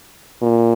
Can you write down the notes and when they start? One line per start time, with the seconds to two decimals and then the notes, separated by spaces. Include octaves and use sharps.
0.42 A#2